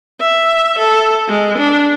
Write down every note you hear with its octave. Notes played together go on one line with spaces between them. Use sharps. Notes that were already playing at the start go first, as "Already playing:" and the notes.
E5
A4
G#3
D4